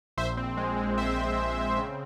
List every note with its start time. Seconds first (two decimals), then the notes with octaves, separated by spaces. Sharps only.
0.17 A#1 C5 E5
0.37 C4
0.57 G#3
0.78 G#3
0.98 G#3 C5 E5
1.18 A#1
1.38 C4
1.58 C4
1.78 C#3